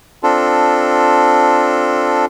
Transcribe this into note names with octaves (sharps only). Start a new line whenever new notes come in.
C4 D4 F4 A4